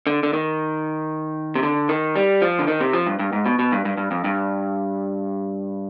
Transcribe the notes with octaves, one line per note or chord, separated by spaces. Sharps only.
D3
D3
D#3
C3
D3
D#3
G3
F3
D3
D#3
C3
F3
G2
G2
G#2
B2
B2
G2
G2
G2
F2
G2